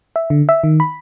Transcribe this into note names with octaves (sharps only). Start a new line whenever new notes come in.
E5
D3
E5
D#3
B5